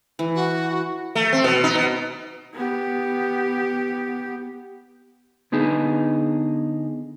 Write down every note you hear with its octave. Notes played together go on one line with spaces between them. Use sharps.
E3
F#4
A3
C4
B2
D#4
B2
B3 G4
D3 B3 D#4 G#4